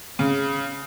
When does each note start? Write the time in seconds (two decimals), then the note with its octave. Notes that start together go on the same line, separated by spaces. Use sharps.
0.19 C#3